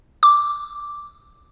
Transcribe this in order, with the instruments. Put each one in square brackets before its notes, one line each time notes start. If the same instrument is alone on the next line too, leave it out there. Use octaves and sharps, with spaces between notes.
[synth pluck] D6